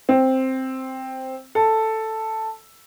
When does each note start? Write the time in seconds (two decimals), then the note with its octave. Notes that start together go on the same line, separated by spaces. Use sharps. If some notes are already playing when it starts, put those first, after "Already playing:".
0.09 C4
1.55 A4